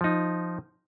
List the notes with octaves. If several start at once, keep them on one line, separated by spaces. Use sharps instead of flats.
F3 D#4